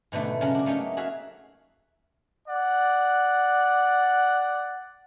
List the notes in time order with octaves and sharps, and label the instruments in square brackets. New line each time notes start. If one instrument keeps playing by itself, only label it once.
[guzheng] G#2 B2 D3 A3
C#3 F#3 G#3 C#4 A#4
D4 F#4
A3 A#3 C#4 D#4
F#4 G#4 E5 F5
[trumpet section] D5 F#5